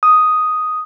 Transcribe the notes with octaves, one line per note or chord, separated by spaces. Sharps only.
D#6